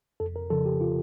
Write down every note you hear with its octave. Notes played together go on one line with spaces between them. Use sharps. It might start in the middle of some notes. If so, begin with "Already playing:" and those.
F2 A4
A#4
C#3 F3 A4
G4
F4